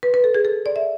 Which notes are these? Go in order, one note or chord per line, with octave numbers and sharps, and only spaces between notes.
B4
B4
A4
G#4
A4
D5
E5